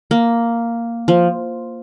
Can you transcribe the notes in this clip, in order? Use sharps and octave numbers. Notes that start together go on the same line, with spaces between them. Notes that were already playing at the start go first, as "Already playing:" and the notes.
A#3
F3